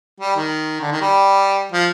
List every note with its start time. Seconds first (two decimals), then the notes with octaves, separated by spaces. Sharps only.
0.20 G3
0.36 D#3
0.81 D3
0.92 D#3
1.01 G3
1.72 F3